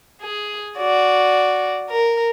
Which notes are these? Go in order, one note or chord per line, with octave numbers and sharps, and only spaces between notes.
G#4
F#4 D5
A#4